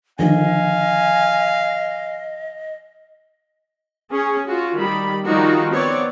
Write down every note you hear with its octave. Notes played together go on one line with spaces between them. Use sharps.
D3 D#3 F3 D#5 F5 G#5
C#4 G#4
F4 F#4
D#3 G3 B5
D#3 F3 G3 D#4 F4 F#4
B3 C4 C#5 D5